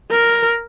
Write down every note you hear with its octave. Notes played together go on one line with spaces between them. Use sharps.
A#4